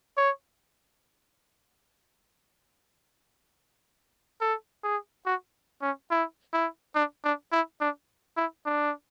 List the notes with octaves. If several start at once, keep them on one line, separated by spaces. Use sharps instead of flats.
C#5
A4
G#4
F#4
C#4
E4
E4
D4
D4
E4
D4
E4
D4